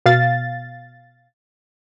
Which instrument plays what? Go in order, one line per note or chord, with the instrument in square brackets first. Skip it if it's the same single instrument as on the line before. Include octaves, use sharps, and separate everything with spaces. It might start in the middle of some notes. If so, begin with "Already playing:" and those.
[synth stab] B2 F5 A6